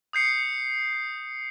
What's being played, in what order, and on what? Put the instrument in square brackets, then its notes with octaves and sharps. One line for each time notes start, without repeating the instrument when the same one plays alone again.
[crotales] D#6 G6 C7 C#7